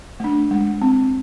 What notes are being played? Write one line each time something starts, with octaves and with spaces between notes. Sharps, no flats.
A3 D4
G#3
C4